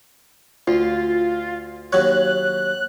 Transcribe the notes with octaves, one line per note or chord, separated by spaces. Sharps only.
D2 F4
D#2 F#3 C#5 F#6